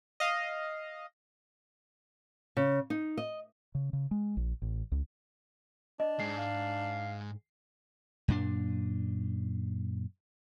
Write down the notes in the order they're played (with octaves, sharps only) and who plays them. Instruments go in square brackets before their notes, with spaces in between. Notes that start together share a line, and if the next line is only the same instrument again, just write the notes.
[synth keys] D#5 F5
[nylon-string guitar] C#3
D#4
D#5
[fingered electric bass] C#3
C#3
G#3
A#1
A1
C#2
[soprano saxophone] D4 [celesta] D#5
[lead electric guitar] G#2 G#3 [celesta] C7
[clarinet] F5
[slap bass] F#2 A#2 D4